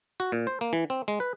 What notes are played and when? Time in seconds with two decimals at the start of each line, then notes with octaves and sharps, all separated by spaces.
0.20 F#4
0.32 A#2
0.47 C5
0.61 A#3
0.73 E3
0.90 C4
1.08 G#3
1.20 B4